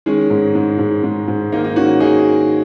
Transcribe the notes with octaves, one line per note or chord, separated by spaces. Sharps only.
D#3 G#3 C#4
G#2
G#2
G#2
G#2
G#2
D#3 A#3 D#4
D#4
D#3 C#4 F#4
D#3 D#4 G#4